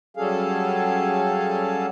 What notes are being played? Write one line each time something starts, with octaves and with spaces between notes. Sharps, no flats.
F#3 G3 C#4 G#4 A4 F5